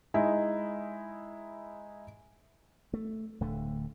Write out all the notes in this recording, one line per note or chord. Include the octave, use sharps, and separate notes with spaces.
G#3 D#4 E4
A3
D1 D3 A3